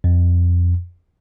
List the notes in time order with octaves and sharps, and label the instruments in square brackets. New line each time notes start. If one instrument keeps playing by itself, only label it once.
[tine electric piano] F2